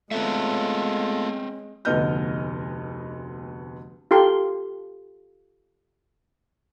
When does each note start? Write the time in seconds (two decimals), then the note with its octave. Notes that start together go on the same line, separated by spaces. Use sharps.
0.11 G#3 A3 B3 C4 F4 A4 C#5 E5
1.85 F1 D2 B3 D#5 F6 G6
4.11 F4 G4 A4 C6